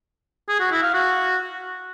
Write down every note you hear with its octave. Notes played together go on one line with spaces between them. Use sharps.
G#4
F#4
E4
F5
F#4